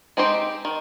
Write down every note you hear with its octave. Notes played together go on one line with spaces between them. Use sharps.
G#3 C4 D#4 G4 C5
D#3